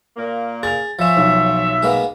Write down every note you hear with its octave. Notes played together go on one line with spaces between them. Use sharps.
A#2 A#3
G#4 A6 F7
F3 C#4 F4 C#5 E5
B1
G#3 A#3 B3